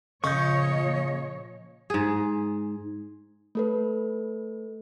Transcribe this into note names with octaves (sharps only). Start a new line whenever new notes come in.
A#2 C#3 F3 C#5 D#5 C#6 G6
G#2 G#4
A3 A4 B4